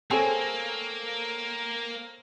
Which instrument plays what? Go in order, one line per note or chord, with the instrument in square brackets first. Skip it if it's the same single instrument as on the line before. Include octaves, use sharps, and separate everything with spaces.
[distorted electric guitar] A#3 [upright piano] C4 A4 C#5 [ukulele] G#4